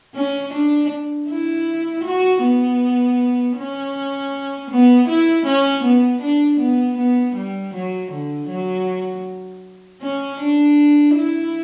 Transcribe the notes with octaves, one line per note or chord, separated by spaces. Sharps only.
C#4
D4
E4
F#4
B3
C#4
B3
E4
C#4
B3
D4
B3
B3
G3
F#3
D3
F#3
C#4
D4
E4